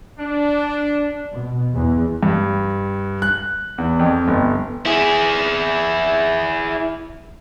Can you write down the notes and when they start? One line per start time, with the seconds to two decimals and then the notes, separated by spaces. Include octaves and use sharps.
0.19 D4
1.32 B2
1.74 E2
2.23 G2
3.22 F#6
3.78 E2
3.99 F2
4.28 G1
4.86 E4 G#4